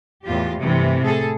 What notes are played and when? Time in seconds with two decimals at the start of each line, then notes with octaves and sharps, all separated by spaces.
0.24 E2 A2 F4 G4
0.59 G2 C3 E3 A3
1.02 A2 G#4 A4